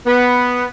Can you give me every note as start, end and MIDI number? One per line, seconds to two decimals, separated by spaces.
0.06 0.67 59